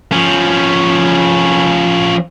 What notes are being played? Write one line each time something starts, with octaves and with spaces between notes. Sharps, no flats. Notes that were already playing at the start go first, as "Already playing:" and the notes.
F3 C#4